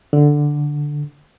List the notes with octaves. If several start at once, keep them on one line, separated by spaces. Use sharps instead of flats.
D3